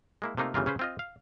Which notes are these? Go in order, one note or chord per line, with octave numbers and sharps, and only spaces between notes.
G#3 A#3 E4
C3 A3 A#3 D#4 F4
G1 C#3 E3 G3 F4 A#4
C#3 C#4 B4 C5
C4 F4 D#5
F5